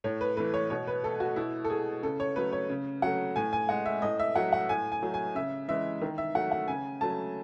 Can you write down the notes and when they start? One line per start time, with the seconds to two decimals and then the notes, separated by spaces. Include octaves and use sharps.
0.04 A2 C#5
0.21 B4
0.37 E3 A3 B4
0.54 C#5
0.70 B2 C#5
0.87 B4
1.03 A3 A4
1.20 F#4
1.36 B2 E4
1.65 A4
1.70 A3 G#4
2.03 C#3 A4
2.20 C#5
2.36 F#3 A3 B4
2.52 C#5
2.69 C#3
3.02 F#3 A3 F#5
3.36 A2 G#5
3.53 G#5
3.69 G#3 F#5
3.86 E5
4.02 A2 D#5
4.20 E5
4.36 F#3 A3 F#5
4.53 F#5
4.69 A2 G#5
4.92 G#5
5.02 F#3 A3
5.14 G#5
5.35 C#3 E5
5.68 E3 G#3 E5
6.02 D#3
6.18 E5
6.35 F#3 A3 F#5
6.52 F#5
6.68 C#3 G#5
7.01 F#3 A3 A5